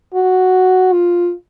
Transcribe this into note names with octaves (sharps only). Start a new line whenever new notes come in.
F#4
F4